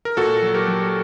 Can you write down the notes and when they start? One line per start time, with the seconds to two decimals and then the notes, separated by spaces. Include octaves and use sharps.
0.05 A#4
0.17 A#2 F#4 A4
0.42 F#3
0.54 G4 A#4
0.68 F#3